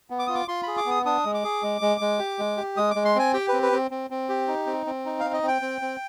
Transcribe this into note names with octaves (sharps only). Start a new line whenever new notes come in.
B3
D6
F4 D#6
D6
F4 C6
G#4 B5
D6
B3 D#6
D4 D#6
G#3
D6
G#4
G#3
G#3
G#3
G4
G#3
G4
G#3 D#6
D6
G#3
C6
C4 G#5
G4 G5
C4 B4
B4
C4
C4
C4
G4
D#4
C4
C4
D#4
F5
C4
D#5
C4
G5
C4
C4